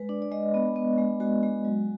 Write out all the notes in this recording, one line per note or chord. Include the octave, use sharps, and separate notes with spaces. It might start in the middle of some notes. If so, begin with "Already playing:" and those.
Already playing: G#3 B4
D4 D5
D5
G#3 D#5
B3
B3
G#3
G#3 F#4
G#3
F#3